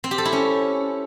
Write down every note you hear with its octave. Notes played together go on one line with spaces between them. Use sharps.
C4
G4
A4
E4
C#4